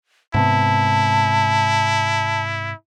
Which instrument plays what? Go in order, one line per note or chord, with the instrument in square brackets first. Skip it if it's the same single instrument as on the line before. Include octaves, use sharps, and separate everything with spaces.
[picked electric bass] G#2 C3 B3 [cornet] E4 [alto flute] A5